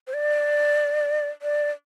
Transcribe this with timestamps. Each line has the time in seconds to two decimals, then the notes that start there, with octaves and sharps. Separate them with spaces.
0.07 C5
0.14 D5
1.42 D5